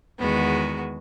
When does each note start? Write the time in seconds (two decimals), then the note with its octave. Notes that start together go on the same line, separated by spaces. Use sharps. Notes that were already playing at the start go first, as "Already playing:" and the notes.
0.19 E2 D#3 G#3 B3 F#4